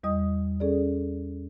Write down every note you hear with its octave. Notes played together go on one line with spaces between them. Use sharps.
E2 G3 D#5 D#6
C#4 G#4 A4 D5